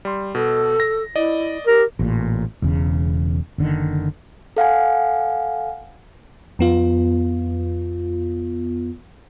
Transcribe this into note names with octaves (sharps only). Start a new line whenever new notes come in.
G3 C6
B2 A4
A#6
E4 D5 D#5
G4 A#4
A1 A#2
E1 E2 C#3
F#1 D3 D#3
A4 F5 F#5 G#5
F2 B3 F4